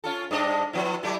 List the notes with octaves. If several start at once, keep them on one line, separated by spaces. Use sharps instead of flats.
C#4 F4 A4
G2 D4 D#5
F3 B3 E4
F#3 A3 E4